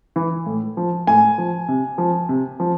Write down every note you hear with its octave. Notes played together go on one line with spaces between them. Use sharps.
E3
A2
F3
A2 G#5
F3
C3
F3
C3
F3